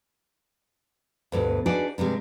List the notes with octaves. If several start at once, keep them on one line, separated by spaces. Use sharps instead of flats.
D2 G2 B2
D4 D#4 F#4 G#4 B4 D5
G2 C3 G3 G#3